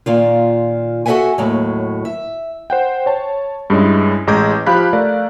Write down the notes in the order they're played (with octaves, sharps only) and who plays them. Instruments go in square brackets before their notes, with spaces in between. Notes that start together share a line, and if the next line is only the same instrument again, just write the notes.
[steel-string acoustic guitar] A#2 D#3 F4
F#4 A4 D#5 E5 F#5 G#5
D#2 A2 F#3
E5
[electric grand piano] C5 F#5 G5
C#5 A5
G2 G#3 C#4 E4
A1 G#3 A#5 D6 G6 G#6
F3 G4 F5 B5 F#6 B6
A3 A#4 D5 F5 A#5